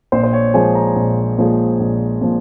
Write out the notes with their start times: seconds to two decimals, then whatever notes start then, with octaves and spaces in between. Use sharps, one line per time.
0.12 A#1 C5
0.23 C5
0.33 C#5
0.54 A#2 F3 G#3 G#5
0.75 A#5
0.96 A#1
1.38 A#2 F3 G#3
1.80 A#1
2.21 A#2 F3